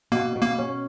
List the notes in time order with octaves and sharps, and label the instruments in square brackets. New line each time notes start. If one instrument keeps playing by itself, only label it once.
[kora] B2 [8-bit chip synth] A#3
[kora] B2
[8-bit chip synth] A#3
[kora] C#4